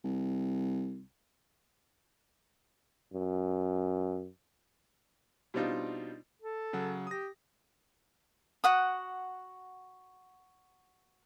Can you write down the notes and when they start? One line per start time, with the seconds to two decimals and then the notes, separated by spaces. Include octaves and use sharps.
0.04 C2
3.13 F#2
5.54 B2 G3 C4 D4 D#4 F4
6.42 A4
6.73 C#3 F#3 F#5
7.07 G4 D#6 A#6
8.64 F#4 F#5 D#6